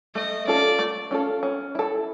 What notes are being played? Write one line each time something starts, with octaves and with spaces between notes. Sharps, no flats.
A3 D#5
C#4 F4 A4 D5
A3
C#4 F4 A4
C#4
E4 A4